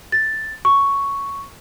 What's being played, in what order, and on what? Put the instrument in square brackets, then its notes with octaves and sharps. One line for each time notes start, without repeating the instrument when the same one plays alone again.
[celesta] A6
C#6